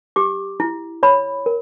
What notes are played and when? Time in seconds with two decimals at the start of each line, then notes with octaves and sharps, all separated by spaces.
0.16 G4 D6
0.60 E4
1.03 C#5 B5
1.46 A#4